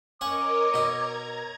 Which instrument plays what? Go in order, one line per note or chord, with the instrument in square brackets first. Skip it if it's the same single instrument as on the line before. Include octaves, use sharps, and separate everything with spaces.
[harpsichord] C#4 F#5 C#6 [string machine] A#4 C#5 D#5 [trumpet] D6
[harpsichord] B2 D#4 [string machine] A#5 G#6